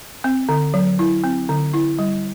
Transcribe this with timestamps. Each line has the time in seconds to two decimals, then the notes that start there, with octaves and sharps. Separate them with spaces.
0.24 C4
0.49 D3
0.74 F#3
0.99 E4
1.24 C4
1.49 D3
1.74 E4
1.99 G3